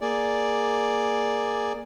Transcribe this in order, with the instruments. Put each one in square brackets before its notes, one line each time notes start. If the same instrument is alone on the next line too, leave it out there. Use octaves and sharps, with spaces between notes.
[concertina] A#3 G#4 D5